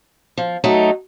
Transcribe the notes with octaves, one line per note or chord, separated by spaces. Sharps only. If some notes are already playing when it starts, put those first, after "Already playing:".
F3
F#3 A3 D#4